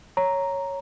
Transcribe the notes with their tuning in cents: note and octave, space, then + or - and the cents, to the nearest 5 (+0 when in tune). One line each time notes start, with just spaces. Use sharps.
C#5 +0 A#5 +0